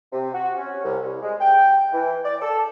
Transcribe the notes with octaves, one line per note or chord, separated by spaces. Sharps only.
C3
F#4
C#4
C2
C2
G#3
G5
E3
D5
A4